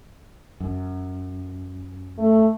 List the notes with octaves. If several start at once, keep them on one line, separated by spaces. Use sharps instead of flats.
F#2
A3